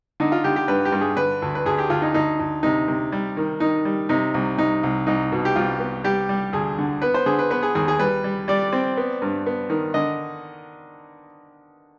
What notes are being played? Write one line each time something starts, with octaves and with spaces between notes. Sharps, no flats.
D3 D#4
F4
D3 G4
G4
G2 B4
G4
G2
G#4
D3 B4
D2
B4
D2 G#4
G4
D2 F4
D#4
D2 D#4
D2
C3 D#4
C3
G3
D#3
D#3 D#4
G3
C3 D#4
C2
C3 D#4
C2
C2 D#4
B2
G4
C2 F4
B3
G3 G4
G3
D2 G#4
D3
B3 B4
C5
D3 G#4
B4
B3 B4
G#4
D#2 G#4
G#4
G3 B4
G3
G3 D5
C4
B3
G2
B3
D#3
D3 D#5